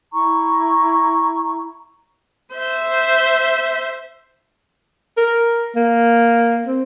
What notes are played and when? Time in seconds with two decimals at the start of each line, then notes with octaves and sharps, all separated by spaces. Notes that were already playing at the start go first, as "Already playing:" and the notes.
0.13 E4 A#5 C#6
2.55 C5 E5
5.17 A#4
5.76 A#3
6.66 C4